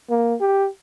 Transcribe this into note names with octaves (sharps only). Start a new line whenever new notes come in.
A#3
G4